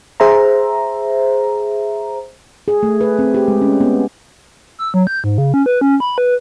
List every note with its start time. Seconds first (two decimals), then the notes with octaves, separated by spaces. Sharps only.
0.20 G#4 C5 E5 A#5
2.68 G#4
2.83 A3
3.01 B4
3.19 C4
3.34 G4
3.48 G#3
3.62 C#4
3.80 B3
4.79 E6
4.94 F#3
5.07 G6
5.24 G#2
5.38 C#3
5.54 C#4
5.66 B4
5.81 C#4
6.00 B5
6.18 B4